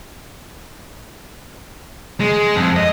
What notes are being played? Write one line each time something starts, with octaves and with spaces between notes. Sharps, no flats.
G#3
F2
D#5